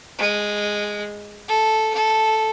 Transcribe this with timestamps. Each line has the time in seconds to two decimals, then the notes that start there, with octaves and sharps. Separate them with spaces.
0.19 G#3
1.48 A4
1.94 A4